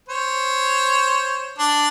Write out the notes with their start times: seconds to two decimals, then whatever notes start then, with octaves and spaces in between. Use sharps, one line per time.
0.09 C5 C#5
1.59 D4